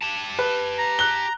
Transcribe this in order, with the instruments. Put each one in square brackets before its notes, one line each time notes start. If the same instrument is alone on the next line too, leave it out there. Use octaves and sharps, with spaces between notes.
[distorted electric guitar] G4 A5
[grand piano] B4
[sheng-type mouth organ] A#5
[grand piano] F#6 G7